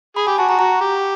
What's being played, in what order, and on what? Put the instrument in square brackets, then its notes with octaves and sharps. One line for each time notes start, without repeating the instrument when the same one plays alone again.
[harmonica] G#4 [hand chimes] B5
[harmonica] G4 [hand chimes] G#5
[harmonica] F#4 [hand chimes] A5
[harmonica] F#4 [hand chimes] A#5
[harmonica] F#4 [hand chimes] A#5
[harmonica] G4